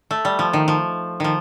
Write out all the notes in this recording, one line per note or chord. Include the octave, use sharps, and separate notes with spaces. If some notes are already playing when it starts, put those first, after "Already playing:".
A3
G3
F3
D#3
F3
D#3 F3